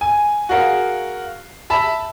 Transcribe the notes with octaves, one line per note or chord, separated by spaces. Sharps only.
G#5
F#4 G#4 A#4 F5
E5 A5 B5